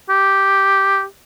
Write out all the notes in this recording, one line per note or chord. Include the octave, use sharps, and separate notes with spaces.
G4